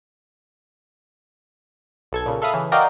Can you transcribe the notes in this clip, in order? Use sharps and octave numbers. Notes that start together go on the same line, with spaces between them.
B1 A4 G#6
A#2 C#3
A4 E5 F5 B5 D#6
C#3 E3
F#4 A#4 D5 D#5 F5 G5